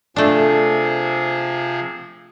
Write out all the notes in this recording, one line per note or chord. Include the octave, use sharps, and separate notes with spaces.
C3 F3 A3 D4 G#4